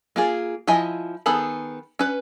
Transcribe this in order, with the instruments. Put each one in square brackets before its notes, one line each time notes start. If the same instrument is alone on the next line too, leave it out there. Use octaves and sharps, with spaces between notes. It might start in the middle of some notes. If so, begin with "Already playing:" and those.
[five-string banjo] A#3 F4 G#4
F3 E4 D#5 E5 G#5
D#3 B3 G#4 A4 B5
C#4 B4